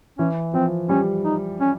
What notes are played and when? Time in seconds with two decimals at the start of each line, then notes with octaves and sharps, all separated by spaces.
0.18 E3 C#4
0.54 F3 C4
0.89 G3 C#4
1.24 D#4
1.60 C#4